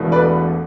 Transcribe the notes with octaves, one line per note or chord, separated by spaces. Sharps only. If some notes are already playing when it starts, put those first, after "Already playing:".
Already playing: E1 E2 B2 A3 E4
B4 D5